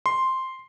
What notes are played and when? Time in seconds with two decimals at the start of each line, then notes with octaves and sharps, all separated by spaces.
0.06 C6